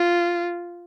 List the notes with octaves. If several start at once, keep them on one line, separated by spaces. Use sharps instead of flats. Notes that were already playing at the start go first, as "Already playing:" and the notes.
Already playing: F4